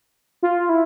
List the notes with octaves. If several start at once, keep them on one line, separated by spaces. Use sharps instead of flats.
F4
E4